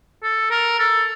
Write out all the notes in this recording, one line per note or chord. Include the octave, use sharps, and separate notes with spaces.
A4
A#4
A4